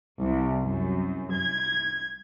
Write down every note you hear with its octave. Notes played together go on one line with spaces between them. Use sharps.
C2
F#2
G#6